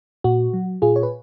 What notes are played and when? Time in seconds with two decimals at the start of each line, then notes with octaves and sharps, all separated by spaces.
0.24 A#2 F#4
0.53 F#3
0.82 A#2 F4 G#4
0.96 C#5
1.03 B4